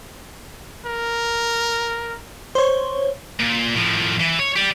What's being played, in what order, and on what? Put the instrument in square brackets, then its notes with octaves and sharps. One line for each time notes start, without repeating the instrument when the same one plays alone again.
[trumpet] A#4
[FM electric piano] C5 C#5
[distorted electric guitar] A#2
A2 F3
E3
C#5
G4 D5